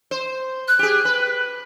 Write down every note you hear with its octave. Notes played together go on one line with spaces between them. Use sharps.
C5
F#6
G4 G#4
B4